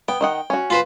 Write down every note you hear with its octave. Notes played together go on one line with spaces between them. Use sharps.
B3 G5
D#3 D#5 F#5
C#4 F#4
F4 B4 C5